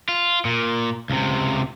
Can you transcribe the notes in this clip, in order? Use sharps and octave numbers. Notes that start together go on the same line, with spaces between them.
F4
A#2
C#2 C3